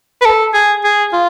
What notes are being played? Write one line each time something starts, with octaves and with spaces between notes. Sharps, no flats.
B4
A4
G#4
G#4
F4